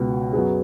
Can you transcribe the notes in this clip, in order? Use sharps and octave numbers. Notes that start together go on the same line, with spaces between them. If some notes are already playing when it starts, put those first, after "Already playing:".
Already playing: C#2 B2 B3 F#4
F#2 F#3 B3 G#4